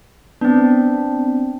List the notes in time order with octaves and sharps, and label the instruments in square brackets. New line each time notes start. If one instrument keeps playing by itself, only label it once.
[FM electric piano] B3 [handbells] C4 D4